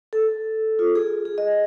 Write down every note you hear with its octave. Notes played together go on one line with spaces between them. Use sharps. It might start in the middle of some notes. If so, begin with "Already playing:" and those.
A4
F4
G#4
G#4
D#5